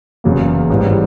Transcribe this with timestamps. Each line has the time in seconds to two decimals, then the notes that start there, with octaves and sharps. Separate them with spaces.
0.24 F#1 E2 C#3 F#3 A#3
0.70 A1 G#2 E3 G3